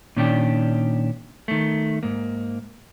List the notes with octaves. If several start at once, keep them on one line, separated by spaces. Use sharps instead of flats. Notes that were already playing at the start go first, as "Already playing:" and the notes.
A#2 D#3 C#4 D4 E4 G4
D#3 A3
G#2 A#3